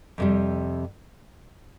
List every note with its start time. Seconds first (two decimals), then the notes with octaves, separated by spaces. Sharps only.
0.18 F2 C3 G3